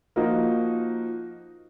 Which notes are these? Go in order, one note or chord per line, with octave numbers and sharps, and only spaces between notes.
F3 A#3 D#4 F#4